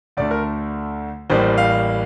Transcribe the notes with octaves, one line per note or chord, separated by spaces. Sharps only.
D2 D3 A3 D5
A#4
A1 A2 G3 A#3 C5
F5